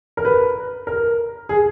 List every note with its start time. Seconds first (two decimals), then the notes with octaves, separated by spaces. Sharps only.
0.17 A#4
0.25 B4
0.87 A#4
1.49 G#4